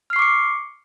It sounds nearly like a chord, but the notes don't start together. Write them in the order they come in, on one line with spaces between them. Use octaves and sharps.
F6 C7 C#6 D6 C#7